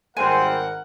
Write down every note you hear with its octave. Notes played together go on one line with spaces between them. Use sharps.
G#1 G3 C4 A#4 C5 F#5 G#5